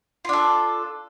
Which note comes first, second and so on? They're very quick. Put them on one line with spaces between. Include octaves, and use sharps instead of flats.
F4 D4 A4